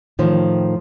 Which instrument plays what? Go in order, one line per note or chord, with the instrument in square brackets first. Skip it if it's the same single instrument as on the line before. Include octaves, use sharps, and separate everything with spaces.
[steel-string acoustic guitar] A2 D#3 F3